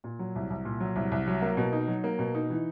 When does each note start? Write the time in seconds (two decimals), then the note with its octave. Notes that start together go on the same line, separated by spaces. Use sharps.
0.04 A#2
0.19 F#3
0.35 C2
0.50 C2
0.65 A#2
0.80 F#3
0.96 C2
1.12 C2
1.27 F#3
1.42 A#3
1.57 B2
1.73 D#4
1.88 F#3
2.04 A#3
2.19 B2
2.35 D#4
2.50 E3